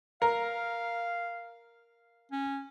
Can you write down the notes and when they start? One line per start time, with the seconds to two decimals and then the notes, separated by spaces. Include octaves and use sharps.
0.22 A#4 F5
2.32 C#4